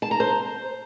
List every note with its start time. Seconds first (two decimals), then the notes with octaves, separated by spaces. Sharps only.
0.02 A5
0.11 A#5
0.20 C5